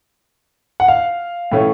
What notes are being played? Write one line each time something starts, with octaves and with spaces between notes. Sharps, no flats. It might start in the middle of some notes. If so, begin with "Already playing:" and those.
F#5
F5
A2 E3 A3 C#4